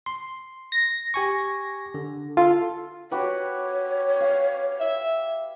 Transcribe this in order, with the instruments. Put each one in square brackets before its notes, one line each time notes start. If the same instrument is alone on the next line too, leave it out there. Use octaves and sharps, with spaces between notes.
[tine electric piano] C6
[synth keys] A#6
[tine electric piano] G4 G#5 C#6
D3
[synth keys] F4 [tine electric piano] A4
[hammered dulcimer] F#4 G4 B4 [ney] C#5
[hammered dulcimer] F5
[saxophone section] E5